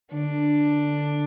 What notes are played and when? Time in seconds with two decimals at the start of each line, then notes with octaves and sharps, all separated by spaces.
0.13 D3 D4